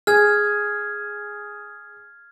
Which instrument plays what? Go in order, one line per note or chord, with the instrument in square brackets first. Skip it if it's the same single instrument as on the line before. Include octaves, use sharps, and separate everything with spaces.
[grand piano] G#4 [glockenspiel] F6 G#6